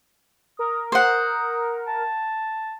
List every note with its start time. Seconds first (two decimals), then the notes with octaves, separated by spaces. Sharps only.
0.59 A#4 D#6
0.92 C5 F#5 D#6
1.88 A5